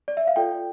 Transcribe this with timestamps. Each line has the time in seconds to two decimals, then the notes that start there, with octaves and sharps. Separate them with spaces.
0.08 D5
0.17 E5
0.27 F5
0.36 F4 A4 D5 G5